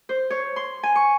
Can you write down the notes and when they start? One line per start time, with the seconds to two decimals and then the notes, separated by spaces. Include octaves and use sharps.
0.09 C5
0.30 C#5
0.56 C6
0.83 G#5
0.95 C#6